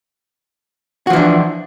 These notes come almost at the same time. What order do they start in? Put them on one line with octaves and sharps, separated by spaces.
F#4 F3 E3 D4